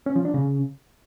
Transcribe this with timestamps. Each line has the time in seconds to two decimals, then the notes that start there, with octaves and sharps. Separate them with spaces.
0.06 C#4
0.16 F3
0.25 D4
0.34 C#3